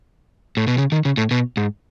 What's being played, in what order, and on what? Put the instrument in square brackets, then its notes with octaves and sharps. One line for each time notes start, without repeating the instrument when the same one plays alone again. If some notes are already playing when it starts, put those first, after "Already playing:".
[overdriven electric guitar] A2
B2
C#3
D#3
C#3
A2
B2
G#2